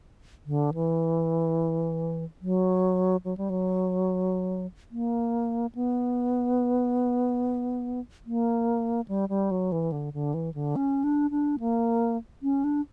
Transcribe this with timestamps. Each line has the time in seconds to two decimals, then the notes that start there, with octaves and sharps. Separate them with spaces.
0.46 D3
0.74 E3
2.41 F#3
3.24 F#3
3.37 G3
3.50 F#3
4.91 A#3
5.75 B3
8.26 A#3
9.08 G3
9.29 G3
9.51 F#3
9.72 E3
9.92 D3
10.13 D3
10.34 E3
10.54 D3
10.76 C#4
11.04 D4
11.31 D4
11.60 A#3
12.43 C#4
12.64 D4